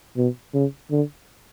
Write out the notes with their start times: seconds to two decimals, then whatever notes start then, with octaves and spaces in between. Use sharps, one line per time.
0.17 B2
0.54 C#3
0.91 D3